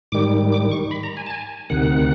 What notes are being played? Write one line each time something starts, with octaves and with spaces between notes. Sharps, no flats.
G#2 D#3 G3 D6
D6
C#6
B5
A#5
G#5
A5
G#5
D2 C3 D#3 F#5